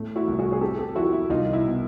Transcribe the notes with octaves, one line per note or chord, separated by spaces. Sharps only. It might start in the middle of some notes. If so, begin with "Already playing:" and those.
Already playing: A2 A3
E4 F#4
C2
F#4 G#4
G#4
C3 G4 A4
G4 A4
F3 E4 F#4
E4
C2 D#4 F4
E4
B2